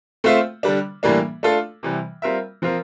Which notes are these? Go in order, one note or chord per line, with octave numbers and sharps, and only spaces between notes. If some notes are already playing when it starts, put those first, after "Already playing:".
A3 C4 F4 C5 E5
D3 G3 D4
A2 E3 G3 A#3 D4
A3 D4 F4 A4
C3 E3 G3
G3 C4 F4 A#4 E5
F3 C4 F4 A#4